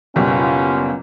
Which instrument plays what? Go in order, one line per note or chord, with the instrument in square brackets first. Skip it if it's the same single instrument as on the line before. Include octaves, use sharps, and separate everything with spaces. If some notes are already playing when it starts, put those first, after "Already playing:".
[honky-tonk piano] F#1 B2 G3 [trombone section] B3 C#4 F4